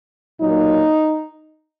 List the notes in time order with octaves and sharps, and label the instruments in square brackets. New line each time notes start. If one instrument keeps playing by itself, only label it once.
[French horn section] A#2 F#3 A#3 D#4